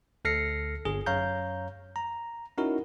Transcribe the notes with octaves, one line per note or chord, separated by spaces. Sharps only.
D2 A4 F6 A#6 C7 C#7
G1 G#4
F#2 C#5 F5 A#5 G6
A#5
C#4 D#4 E4 F#4 A#4